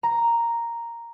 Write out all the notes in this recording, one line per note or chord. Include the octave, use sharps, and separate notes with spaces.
A#5